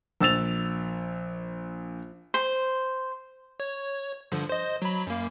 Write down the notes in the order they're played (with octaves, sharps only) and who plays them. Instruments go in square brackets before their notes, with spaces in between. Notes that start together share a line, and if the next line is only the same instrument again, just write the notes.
[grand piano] A#1 E6 A6 F7
[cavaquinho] C5
[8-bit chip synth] C#5
G2 D3 F3
C5 D#5
F#3 B5
F#2 A#3